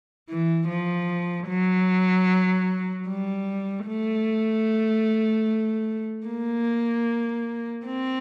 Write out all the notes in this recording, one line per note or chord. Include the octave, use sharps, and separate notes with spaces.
E3
F3
F#3
G3
A3
A#3
C4